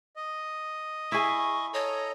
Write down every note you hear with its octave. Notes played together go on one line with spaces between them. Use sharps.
D#5
E4 G#4 C#6
A4 C#5 D#5 A#5